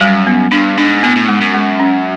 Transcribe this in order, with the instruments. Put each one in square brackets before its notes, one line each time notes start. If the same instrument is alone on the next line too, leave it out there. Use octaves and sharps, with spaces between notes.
[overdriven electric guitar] F#2 [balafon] G3
[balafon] B3
[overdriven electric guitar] G2 [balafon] D4
[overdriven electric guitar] G#2 [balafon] D4
[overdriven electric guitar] A2 [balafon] B3
[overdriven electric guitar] A2
[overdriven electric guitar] G#2 [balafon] G#3
[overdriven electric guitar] F#2
[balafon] G#3
C#4